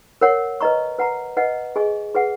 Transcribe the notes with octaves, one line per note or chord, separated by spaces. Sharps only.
A#4 C#5 F#5
B4 D#5 A#5 C#6
B4 F#5 A#5
B4 D#5 F#5
G#4 D#5 G#5 C#6
G#4 B4 F#5